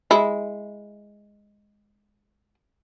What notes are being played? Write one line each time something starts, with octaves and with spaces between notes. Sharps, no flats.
G#3 E4